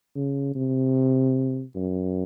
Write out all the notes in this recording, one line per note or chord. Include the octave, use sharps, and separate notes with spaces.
C#3
C3
F#2